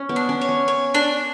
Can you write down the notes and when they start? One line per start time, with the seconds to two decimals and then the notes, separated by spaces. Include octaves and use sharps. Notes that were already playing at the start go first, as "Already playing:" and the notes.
Already playing: C#4
0.09 B3
0.16 D4
0.29 C#4
0.41 C#5
0.49 C#4
0.68 C#5
0.95 D4